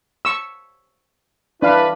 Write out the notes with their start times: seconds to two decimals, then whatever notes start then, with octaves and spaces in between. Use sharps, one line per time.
0.25 C#6 E6
1.62 E3 D4 E4 B4 F5